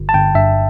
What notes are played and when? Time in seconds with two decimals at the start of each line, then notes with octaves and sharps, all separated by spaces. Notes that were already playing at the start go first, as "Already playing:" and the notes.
Already playing: G1
0.09 A5
0.14 G1 G5
0.35 G2 E5